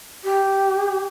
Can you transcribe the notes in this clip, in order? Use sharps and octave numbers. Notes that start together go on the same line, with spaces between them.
G4